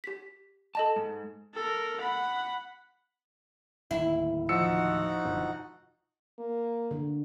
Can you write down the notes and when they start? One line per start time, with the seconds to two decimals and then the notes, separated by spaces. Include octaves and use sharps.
0.04 G4 B6
0.75 A4 D#5 A5 E7
0.96 G#2
1.54 A4 A#4
2.00 F#5 B5
3.91 D1 D#2 E4
4.49 F3 D#4 F#4 F#5 E6 C#7
5.25 E1 F#2 D3
6.39 A#3
6.91 D3